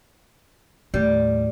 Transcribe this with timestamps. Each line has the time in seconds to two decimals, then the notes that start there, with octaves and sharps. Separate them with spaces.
0.94 D#2 A2 G3